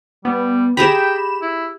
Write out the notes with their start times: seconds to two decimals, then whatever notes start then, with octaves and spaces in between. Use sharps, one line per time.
0.25 G3 B3
0.77 G4 G#4 G5 A#5 B5 E7
1.42 E4